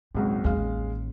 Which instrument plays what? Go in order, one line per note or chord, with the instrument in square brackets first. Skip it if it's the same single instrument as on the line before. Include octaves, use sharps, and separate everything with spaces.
[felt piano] G#1 C#2 F#3 [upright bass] A#2
[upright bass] A1 D#2 [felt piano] G#3 F5